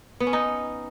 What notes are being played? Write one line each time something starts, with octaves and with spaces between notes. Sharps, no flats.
B3
C#4
D#4